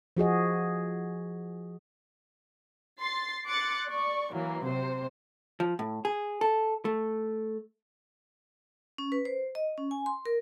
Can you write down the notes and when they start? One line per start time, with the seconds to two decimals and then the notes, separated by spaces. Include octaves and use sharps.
0.17 F3 F#4 G#4 D#5
3.00 C6 A6 C7
3.46 C6 D6 F#6 A6 C#7
3.87 D5 C#6
4.33 E3 F#3 A#3
4.65 C3 C5
5.60 F3
5.79 A2
6.05 G#4
6.41 A4
6.85 A3
8.98 C#4
9.12 B4
9.25 C5
9.55 D#5
9.78 C#4
9.91 G#5
10.06 C6
10.25 A#4